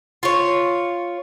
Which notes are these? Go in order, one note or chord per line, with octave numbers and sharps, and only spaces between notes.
F4 C#5